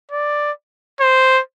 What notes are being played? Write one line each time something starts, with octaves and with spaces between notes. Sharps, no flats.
D5
C5